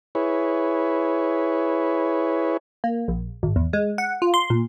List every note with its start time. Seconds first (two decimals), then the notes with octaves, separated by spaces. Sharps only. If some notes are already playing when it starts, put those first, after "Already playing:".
0.15 E4 G#4 B4 C#5
2.84 A#3
3.08 A#1
3.43 G#1
3.56 E2
3.73 G#3
3.98 F#5
4.22 F4
4.34 C6
4.50 A#2